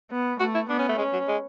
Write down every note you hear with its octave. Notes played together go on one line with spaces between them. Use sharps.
B3
A3 F#4
E4
B3 D4
C#4
A3
G#3 C#4
F#3
G#3